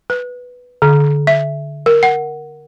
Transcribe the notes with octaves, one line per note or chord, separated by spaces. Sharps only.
B4
D3
E5
A#4
F#5